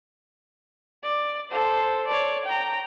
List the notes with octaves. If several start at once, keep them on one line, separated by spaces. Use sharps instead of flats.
D5
A4 C5
C#5 D5
G5 A#5